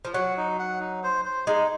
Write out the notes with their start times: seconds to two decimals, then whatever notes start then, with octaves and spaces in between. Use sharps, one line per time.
0.05 F3
0.14 F#3 F#5
0.37 D#4
0.59 F#5
0.80 D#4
1.03 C5
1.25 C5
1.47 G#3 D#4